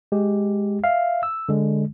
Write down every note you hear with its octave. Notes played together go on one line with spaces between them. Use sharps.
G#3 G4
E5 F5
E6
D3 G#3